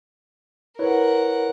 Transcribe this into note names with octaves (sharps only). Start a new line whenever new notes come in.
E4 A#4 B4 C#5 F#5